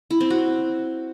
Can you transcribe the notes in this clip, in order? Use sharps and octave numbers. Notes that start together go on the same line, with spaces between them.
E4
C4
F#4